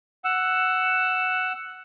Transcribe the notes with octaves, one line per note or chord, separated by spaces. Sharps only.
F#5 E6